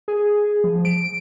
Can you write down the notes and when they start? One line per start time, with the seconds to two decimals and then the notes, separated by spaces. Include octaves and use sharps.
0.08 G#4
0.64 F3
0.85 D7